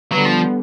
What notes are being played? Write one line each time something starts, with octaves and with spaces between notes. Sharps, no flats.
D3 F#3 G3 B3
F3